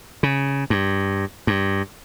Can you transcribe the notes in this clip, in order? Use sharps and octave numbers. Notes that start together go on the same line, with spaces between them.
C#3
G2
G2